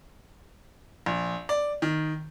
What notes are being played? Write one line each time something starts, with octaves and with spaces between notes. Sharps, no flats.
A#1
D5
D#3